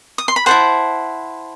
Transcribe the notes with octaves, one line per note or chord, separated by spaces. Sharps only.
D#6
C6
B5
E4 A4 C5 F#5 A5